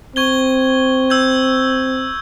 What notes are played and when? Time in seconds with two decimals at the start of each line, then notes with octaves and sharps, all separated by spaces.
0.16 C4 C#6 G#6 G7
1.10 E6 G6 G#6